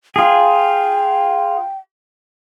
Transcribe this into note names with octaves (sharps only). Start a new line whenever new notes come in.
F4 G#4 G5